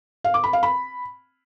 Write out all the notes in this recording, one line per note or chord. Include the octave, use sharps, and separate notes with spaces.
F5
D6
B5
F5
B5